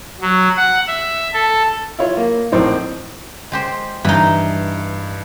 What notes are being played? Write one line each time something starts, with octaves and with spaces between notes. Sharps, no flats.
F#3
F#5
E5
A4
E4 F4 C#5
A#3
A#1 A2 C4 D#4
G#3 G4 C5
G2 E3 D#4